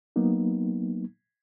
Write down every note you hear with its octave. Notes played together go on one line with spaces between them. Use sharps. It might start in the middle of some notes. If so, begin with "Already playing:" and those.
F#3 A#3 B3 D#4